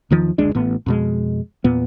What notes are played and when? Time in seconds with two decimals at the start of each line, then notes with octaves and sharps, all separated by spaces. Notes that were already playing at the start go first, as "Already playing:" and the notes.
0.10 E2 D#3 F3
0.38 F#1 D2 G#3 D4
0.55 A1 A2 B3
0.86 F2 B2 G#3
1.64 E2 A#2 B3